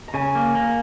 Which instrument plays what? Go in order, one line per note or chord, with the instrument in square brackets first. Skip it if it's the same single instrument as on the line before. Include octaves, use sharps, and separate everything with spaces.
[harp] A#5
[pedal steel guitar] C#3 [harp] G#5
[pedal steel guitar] A#3
A#3